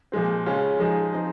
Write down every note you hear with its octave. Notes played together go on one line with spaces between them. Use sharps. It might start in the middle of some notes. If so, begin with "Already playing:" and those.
A#2 F3 G#3 C4
C#3 G#3 C#4 F4
F3 G#3 D#4 G#4
F3 C4 D#4 G#4